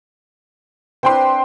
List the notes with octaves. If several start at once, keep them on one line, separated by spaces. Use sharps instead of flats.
C4 D4 B4 C5 G5 C6